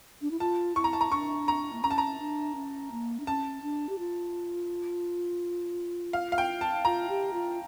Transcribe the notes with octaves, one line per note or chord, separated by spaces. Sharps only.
D4
E4
F4 A5
E4 C#6
A#5
A5
A#5
D4 C#6
A#5
A#3
C#4 A#5
A5
A#5
D4
C#4
A#3
D4
C#4 A5
D4
G4
F4
F5
F5
G5
A5
F4 A#5
G4
F4